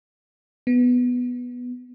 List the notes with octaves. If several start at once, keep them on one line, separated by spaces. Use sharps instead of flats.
B3